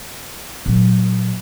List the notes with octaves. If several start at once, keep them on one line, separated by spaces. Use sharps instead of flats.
A#2 F#3